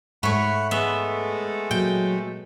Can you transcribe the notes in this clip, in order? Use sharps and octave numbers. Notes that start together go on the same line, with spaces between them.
G#2 A3 C#5 F#5 B5
G#3 A3 B3 E5
A#2 F#3 G5